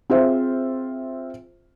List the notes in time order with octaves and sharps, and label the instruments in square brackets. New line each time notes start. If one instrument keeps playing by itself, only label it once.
[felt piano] C4 F4 G#4 C5 E5